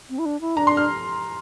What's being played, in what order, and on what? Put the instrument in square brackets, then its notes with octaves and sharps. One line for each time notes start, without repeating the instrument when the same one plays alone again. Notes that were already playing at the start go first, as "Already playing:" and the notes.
[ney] C4
E4
D4
E4
[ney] D4 [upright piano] A#5
[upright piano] C6
F6